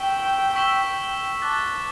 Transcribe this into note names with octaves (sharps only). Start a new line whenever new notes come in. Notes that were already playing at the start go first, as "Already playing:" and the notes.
Already playing: G5 C#6 E6 B6 E7 G7
C#6 E6 B6 E7 G7
A5 D6 F#6 A6